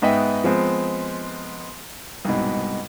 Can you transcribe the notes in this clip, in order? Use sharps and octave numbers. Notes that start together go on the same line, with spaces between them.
G#2 B3 B4 D#5 E5 G5
F3 G#3 B3 C4
C2 G#2 B2